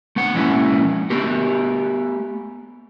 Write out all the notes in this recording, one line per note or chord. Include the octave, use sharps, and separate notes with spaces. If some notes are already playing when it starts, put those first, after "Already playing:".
A3 B3 F#5
F3 G#3 A#3 C#4 E4
A3 B3 G4 A#4